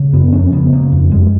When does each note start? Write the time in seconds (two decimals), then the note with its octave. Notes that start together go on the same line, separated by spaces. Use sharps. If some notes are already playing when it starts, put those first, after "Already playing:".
Already playing: C#3
0.13 F#2 B3
0.32 F2 C#4
0.52 C#3 B3
0.73 C#3 A#3
0.92 F2
1.11 F#2 G#3